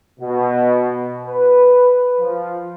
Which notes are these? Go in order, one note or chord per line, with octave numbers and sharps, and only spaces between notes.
B2
B4
F3